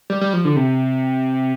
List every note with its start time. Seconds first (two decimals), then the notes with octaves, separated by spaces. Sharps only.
0.10 G3
0.21 G3
0.33 F3
0.45 D3
0.56 C3